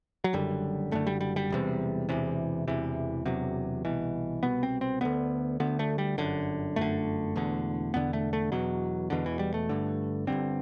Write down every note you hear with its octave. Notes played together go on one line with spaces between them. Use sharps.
F#3
F#1 F#2 D3 G3
F#1 F#2 D3 A3
G3
G3
G3
E1 E2 C3
E1 E2 C3 E3
E1 E2 C3 E3
E1 E2 C3 F#3
C2 B2 E3
C2 B2 B3
C4
C4
D2 D3 B3
D2 D3 B3
A3
G3
G1 F#2 D3
G1 F#2 D3 A3
E1 E2 D3
E1 E2 D3 B3
A3
A3
E1 E2 B2 F#3
E1 E2 B2 D3
E3
G3
A3
G1 G2 D3
G1 G2 D3 C4